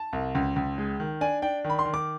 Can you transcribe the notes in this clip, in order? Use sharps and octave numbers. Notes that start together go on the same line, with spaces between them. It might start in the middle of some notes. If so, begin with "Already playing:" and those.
Already playing: A5
C2
C#2
C#2
G#3
D#3
D4 G#5
D4 G5
D#3
B5
C6
D#3
D6